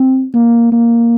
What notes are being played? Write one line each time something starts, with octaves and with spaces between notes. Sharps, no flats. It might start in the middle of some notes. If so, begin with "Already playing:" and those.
Already playing: C4
A#3
A#3